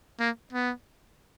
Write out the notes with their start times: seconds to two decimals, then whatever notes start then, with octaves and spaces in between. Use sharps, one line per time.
0.20 A#3
0.53 B3